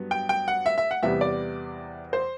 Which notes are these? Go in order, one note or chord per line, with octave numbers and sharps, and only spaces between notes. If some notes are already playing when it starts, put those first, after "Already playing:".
Already playing: G2 F#3 B3
G5
G5
F#5
E5
E5
F#5
E2 C3 G3 B3 E4 E5
D5
C5